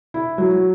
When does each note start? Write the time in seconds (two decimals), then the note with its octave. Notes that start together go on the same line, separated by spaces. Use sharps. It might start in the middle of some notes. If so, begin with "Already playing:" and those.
0.14 E4
0.38 F#3